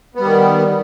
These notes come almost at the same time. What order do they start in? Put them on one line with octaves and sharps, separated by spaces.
B3 G3 D#3